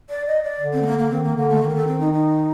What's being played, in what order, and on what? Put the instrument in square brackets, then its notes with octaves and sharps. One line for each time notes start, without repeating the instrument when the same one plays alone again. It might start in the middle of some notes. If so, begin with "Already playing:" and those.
[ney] D5
D#5
D5
[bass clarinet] D3
[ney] C4
A3
A#3
A#3
[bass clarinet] D#3 [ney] C4
[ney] A#3
[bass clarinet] D3 [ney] A#3
[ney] A3
[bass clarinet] D#3 [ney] A#3
[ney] A#4
A4
C4
D#4
D#4